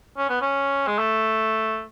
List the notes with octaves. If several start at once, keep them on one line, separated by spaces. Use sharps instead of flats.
C#4
B3
C#4
G#3
A3